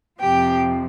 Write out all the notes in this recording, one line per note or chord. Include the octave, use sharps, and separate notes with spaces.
F2 C3 F3 G4 G5